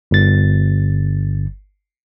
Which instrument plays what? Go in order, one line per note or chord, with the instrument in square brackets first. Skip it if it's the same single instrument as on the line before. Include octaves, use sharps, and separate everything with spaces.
[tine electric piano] G1 A6